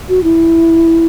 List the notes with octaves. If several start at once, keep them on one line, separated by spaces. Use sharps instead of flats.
F#4
E4